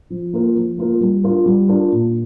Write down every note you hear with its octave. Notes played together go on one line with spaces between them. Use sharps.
F3
A#3 F4 A#4
F3
A#3 F4 A#4
G3
D4 F4 A#4
G3
D4 F4 A#4
A#2